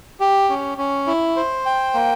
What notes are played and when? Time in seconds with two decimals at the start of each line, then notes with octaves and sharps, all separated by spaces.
0.20 G4
0.50 C#4
0.78 C#4
1.07 E4
1.36 C5
1.66 G5
1.94 A#3